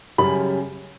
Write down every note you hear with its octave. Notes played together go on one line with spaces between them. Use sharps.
F#2 C#3 G3 C#4 B5